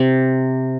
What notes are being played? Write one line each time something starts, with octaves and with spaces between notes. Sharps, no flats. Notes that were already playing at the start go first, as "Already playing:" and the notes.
Already playing: C3